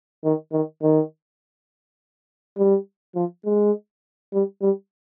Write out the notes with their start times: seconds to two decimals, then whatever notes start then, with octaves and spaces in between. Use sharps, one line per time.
0.24 D#3
0.53 D#3
0.83 D#3
2.58 G3
3.16 F3
3.45 G#3
4.33 G3
4.62 G3